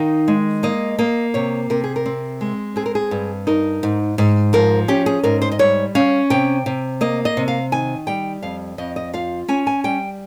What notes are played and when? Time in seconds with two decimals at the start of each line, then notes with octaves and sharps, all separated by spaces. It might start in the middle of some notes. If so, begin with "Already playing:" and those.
Already playing: D#3 D#4 F5
0.28 G#3
0.63 A#3 D#5
0.99 A#3 D#5
1.34 C3 C#5
1.70 C3 A#4
1.84 G#4
1.96 A#4
2.06 C4
2.41 G#3
2.76 C4 G#4
2.86 A#4
2.95 G#4
3.11 G2
3.47 D#4 A#4
3.83 G#2
4.18 G#2
4.53 F3 A#4
4.88 C#4 G4
5.06 G#4
5.23 G#2 A#4
5.42 C5
5.52 D#5
5.59 G3 C#5
5.95 C#4 F5
6.30 C3 G5
6.66 C3
7.01 A#3 D#5
7.25 D#5
7.37 C3
7.48 F5
7.72 D#3 G#5
8.07 G3 G5
8.43 F2 F5
8.78 F2 D#5
8.96 D#5
9.13 F4 F5
9.48 C#4 G#5
9.67 G#5
9.84 G3 G5